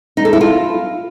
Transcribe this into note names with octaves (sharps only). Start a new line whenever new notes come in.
D#4
A4
E4
F4